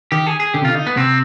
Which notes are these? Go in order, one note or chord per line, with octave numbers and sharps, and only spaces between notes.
D#3 G4
G#4
G#4
D3 G4
C3
D3 F4
D#4
B3
C3 C4